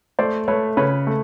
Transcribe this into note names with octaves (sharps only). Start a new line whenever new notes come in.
A3 C5 D5
A3 B4 C#5
C#3 B4 C#5
A3